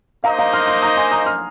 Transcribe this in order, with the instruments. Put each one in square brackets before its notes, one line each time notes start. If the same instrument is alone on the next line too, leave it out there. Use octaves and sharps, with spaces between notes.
[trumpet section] A#3 D#4 C5 D#5 [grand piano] F5 A#5
[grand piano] F5 A#5
C6 F6
C6 F6
A#5 D#6
G#5 C6
A#5 D#6
C6 F6